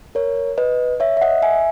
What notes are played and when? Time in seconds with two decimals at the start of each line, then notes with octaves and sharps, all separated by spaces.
0.15 A#4 C#5
0.58 B4 D#5
1.00 C#5 E5
1.17 E5
1.21 D#5 F#5
1.42 E5 G#5